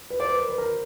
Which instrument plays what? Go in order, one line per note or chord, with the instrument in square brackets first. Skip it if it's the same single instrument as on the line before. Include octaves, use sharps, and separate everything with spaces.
[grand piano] B4
[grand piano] C5 [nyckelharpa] D5
[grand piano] B4
A#4
B4
A#4